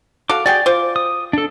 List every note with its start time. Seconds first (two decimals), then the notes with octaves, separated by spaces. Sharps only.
0.29 F#4 A4 F5 D6
0.46 F#4 G#4 D5 G5
0.66 F4 C5 D6
0.96 D#6
1.33 D4 A4